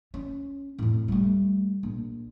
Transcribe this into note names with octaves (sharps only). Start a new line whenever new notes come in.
C#4
F2 A2
G3 A3
A#1